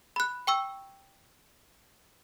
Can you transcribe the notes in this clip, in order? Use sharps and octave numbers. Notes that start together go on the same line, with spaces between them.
B5 F#6
G5 C#6 E6